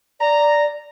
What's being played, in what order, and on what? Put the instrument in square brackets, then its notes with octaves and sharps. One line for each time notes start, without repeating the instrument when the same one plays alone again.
[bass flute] D5 [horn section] A#5